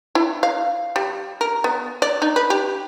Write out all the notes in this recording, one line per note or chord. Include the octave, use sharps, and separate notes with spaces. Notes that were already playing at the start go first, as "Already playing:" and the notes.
E4
F5
G3
A#4
B3
D5
D#4
B4
G4